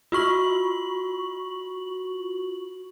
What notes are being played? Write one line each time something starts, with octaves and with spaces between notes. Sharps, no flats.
F4 F#4 C#6 F#7